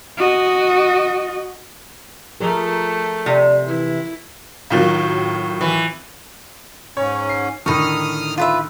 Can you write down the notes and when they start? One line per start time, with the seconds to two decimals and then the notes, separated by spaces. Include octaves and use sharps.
0.17 F#4 D#5
2.40 F3 A3 G#4 A#4
3.26 C3 D5
3.67 E3 E4
4.70 A2 D#3 F#3 C4 F4 F5
5.61 E3
6.97 G#2 C#4 C#5
7.29 C7
7.66 A2 D3 D#3 D#4 C#6 D#6 F6
8.38 F4 B4 E5